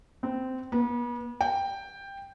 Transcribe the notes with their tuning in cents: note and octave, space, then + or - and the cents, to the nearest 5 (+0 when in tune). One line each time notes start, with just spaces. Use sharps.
C4 -15
B3 -40
G5 +10